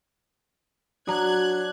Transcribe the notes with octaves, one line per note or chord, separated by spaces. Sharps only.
F#3 D4 F#4 A#5 F#6 G#6